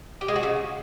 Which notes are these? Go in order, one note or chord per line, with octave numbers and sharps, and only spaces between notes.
G4
G#3
F#4
C#3